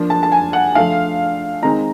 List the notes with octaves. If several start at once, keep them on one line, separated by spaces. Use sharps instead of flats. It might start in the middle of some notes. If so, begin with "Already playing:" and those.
Already playing: F3 A#3 D4
A5
A5
G#5
F#5
F3 A3 D4 F5
D#3 G#3 C4 D#4 A#5